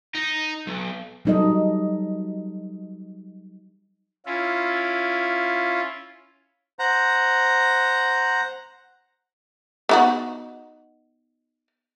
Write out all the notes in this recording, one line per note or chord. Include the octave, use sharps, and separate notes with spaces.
D#4
B1
F#3 G3 D#4 A4 D#5
C#4 E4 F4
C5 F#5 A#5
B3 D#4 F#4